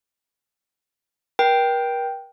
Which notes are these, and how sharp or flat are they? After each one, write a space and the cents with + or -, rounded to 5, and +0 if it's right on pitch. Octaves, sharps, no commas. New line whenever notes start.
A#4 +40 G5 +0